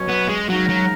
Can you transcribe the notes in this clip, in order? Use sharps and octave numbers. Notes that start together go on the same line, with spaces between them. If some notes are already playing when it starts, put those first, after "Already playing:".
Already playing: B2 F#3 C#4
B3
G#3
C#3 F#3 G#3 D#4 A#4
F#3